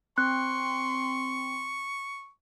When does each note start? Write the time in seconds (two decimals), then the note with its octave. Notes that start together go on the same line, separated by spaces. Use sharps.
0.18 C4 C6 C#6 F#6